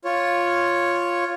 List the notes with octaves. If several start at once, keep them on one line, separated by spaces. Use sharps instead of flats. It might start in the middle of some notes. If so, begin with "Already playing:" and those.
F4 C#5